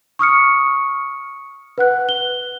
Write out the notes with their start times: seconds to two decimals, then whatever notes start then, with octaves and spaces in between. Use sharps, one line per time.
0.19 C#6 D#6 F6 C#7
1.78 B4 F#5 F#6
2.09 G7